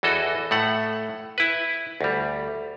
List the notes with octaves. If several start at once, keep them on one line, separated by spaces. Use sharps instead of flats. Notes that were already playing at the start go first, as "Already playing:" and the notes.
E2 E3 F#4 A4 D#5
A2 A3 F#5
E4 B4
D2 G3